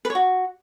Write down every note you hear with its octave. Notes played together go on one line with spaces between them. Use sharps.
B4
C#5
F#4